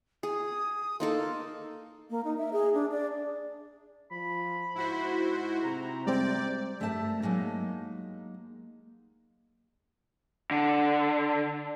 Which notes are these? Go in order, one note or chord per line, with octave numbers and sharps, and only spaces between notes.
G#4 D#6
A#3 D#4 A4 C6
A#3
D#4
E5
G#4
D4
D5
F3 B5
G#2 E4 F#4 C5
C3 A#5
G3 G#3 C4 D5 G5
G2 A3 A#4 C5 E5 A5
F#3 G#3 A#3 D#4
D3